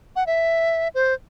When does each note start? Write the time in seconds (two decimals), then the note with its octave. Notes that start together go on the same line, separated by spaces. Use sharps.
0.16 F#5
0.27 E5
0.95 C5